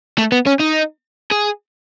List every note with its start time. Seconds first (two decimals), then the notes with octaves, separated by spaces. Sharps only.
0.18 A3
0.32 B3
0.47 C#4
0.60 D#4
1.32 G#4